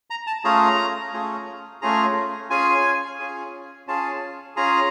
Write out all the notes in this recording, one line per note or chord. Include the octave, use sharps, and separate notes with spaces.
A#5
A5
A3 C#4 F4 G#4 A#5
A3 C#4 F4 G#4
A3 C#4 F4 G#4 A#5
C#4 F4 G#4 G#5
C#4 F4 G#4
C#4 F4 G#4 A5
C#4 F4 G#4 A#5